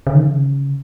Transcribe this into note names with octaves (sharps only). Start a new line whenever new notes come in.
C#3
D#3
C#3